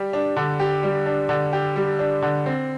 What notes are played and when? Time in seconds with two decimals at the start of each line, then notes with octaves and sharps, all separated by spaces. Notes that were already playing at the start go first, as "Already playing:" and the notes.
Already playing: G3 G4
0.13 D4
0.36 D3
0.60 G4
0.83 G3
1.06 D4
1.29 D3
1.53 G4
1.76 G3
1.99 D4
2.22 D3
2.46 C4